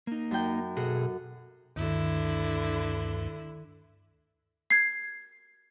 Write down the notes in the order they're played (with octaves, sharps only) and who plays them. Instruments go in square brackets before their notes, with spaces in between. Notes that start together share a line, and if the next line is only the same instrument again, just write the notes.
[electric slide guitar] A#3 D#4
[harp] F#2 G5
[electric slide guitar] B2 G#4 A4 [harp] F#4
[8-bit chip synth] D2 G2 [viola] D3 E4 [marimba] D#3
[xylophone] G#6 C7